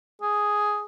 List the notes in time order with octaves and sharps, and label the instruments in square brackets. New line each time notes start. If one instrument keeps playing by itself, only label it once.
[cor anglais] G#4